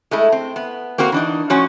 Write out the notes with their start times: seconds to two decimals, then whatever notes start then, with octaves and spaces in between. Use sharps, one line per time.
0.11 G#3 A3 E4
0.32 C4
0.56 B3
0.98 A#3 C4 F#4 A#4
1.12 E3 D4 D#4
1.50 A2 F3 C#4 F#4 C#5